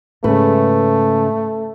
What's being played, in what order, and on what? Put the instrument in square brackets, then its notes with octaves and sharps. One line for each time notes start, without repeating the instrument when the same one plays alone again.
[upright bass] G#2 [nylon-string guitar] C#3 B4 [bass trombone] A3